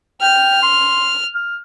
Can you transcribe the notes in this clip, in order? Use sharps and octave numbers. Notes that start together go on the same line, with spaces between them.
G5 F6
C6
F6